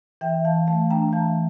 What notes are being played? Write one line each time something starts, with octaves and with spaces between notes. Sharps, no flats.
E3 E5 G5
E3 F5 A5
A3 F5 A5
D4 G5 A#5
E3 F5 A5